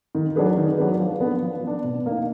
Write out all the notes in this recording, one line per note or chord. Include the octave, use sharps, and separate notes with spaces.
D#3
F#3 D4 G#4 B4
D#3
F#3 D4 G#4 B4
F3
B3 D4
F3
B3 D4
B2
A#3 D#4